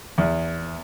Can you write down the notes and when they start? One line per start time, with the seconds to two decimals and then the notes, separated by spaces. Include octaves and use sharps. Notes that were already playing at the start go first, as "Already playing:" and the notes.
0.18 E2